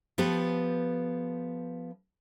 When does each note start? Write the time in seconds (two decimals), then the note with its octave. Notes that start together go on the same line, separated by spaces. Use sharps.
0.18 F3 B3 G4 A4 B4